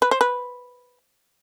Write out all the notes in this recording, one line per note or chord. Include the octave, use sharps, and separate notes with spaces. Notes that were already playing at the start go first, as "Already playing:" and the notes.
B4
C5
B4